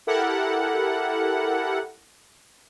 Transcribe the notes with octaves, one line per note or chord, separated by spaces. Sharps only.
E4 G4 A4 A#4 F#5